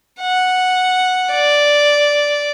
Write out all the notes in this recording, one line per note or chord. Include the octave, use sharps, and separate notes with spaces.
F#5
D5